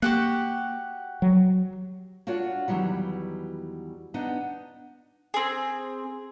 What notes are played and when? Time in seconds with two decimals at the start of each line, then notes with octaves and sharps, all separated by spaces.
0.02 A#3 F#4 G4 F#5
1.22 F#3
2.27 D4 F4 F#4 C#5 F#5
2.68 E2 D#3 E3 F#3 G3
4.14 B3 D4 D#4 F#5
5.34 C4 G#4